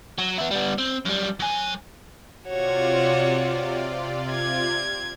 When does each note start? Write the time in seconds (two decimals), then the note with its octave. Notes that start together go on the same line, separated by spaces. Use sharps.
0.18 F#3
0.38 B3 E4
0.51 G3 B3
0.78 C4
1.06 F#2 G3
1.40 F#3 G#5
2.48 C3 F4 F#4 C#5 D5
4.32 G#6